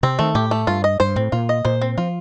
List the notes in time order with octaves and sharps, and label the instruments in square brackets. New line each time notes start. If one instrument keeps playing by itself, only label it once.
[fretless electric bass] C3 [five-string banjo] C4
[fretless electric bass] D#3 [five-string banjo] A3
[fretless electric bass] A2 [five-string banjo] G4
[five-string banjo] A3
[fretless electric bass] G2 [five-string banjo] F4
[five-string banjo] D#5
[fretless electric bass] G2 [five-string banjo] C5
[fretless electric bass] A2 [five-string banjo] C4
[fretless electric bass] A#2 [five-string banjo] F4
[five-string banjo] D#5
[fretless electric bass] A#2 [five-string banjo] C5
[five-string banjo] C4
[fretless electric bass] F3 [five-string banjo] F4